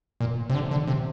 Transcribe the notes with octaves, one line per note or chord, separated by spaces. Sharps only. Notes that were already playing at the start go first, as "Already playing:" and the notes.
A#2
C3
D3
D3
C3